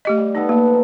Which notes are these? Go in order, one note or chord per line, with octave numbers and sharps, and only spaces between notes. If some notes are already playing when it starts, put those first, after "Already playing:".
A3 G4 D#5
G3
B3 D#4 A4 B4
A#3
F3 D#4